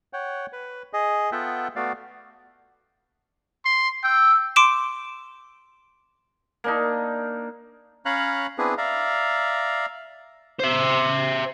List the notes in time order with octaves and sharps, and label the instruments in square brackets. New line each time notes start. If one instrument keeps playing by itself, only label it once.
[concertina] C#5 F#5 G5
B4
G#4 D#5
B3 F4 A4 E5 F#5 G5
A3 B3 F#4 D5 F5
[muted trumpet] C6
[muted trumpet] G5 [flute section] E6
[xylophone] C6 D6 D7 E7
[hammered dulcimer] A#3 D4 D#4
[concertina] C#4 C#5 F5 A#5 B5 F#6
B3 C4 D4 E4 G#4 B4
D5 E5 F5 A#5
[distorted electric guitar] C5 E5